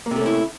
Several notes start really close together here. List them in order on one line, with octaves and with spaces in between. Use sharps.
A#3 C3 A3 C#4 E4